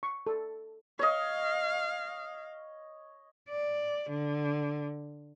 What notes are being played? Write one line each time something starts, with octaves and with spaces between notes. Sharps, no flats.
C#6
A4
C#5 D#5 F5
D5
D3